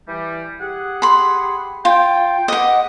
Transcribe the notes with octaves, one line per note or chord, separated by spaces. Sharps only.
E3 G3
G4 G#4 F#5
B5 C6
F4 G5
G#2 B4 D#5 F#5 D6